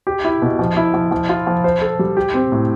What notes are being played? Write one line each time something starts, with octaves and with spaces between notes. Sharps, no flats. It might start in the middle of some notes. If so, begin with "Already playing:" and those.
G4
E4
B2
F3
E4
F3
F3
F4
F3
C5
A4
G3
G4
C4
A2